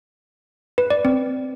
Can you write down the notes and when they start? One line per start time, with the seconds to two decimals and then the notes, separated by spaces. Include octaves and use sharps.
0.78 B4
0.90 D5
1.05 C4